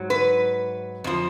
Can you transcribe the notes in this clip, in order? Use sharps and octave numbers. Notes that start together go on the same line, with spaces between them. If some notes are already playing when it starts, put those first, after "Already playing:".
Already playing: G#2 F#3
B4
F2 F3